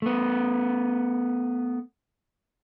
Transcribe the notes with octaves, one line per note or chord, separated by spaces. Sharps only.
A3 B3